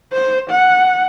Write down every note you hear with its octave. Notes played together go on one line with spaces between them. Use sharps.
C5
F#5